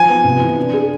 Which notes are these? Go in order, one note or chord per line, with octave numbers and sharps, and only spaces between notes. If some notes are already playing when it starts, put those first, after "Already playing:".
Already playing: F3 G#5
B3
C3
E3
D4
G#4